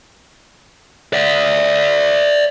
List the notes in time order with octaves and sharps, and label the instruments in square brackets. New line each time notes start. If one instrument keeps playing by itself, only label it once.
[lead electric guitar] D5 E5